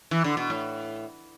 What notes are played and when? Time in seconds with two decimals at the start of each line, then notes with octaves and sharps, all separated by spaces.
0.11 E3
0.24 D3
0.37 B2
0.50 A2